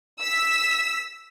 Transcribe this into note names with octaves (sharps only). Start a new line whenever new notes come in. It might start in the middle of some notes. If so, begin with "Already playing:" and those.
E6 B6